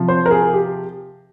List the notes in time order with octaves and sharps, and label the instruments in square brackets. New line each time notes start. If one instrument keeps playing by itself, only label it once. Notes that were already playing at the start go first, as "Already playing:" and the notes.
Already playing: [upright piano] C3 F3
C5
A#4
G#4
G4